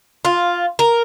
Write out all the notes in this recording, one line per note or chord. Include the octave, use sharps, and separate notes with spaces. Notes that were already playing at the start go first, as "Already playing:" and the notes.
F4
A#4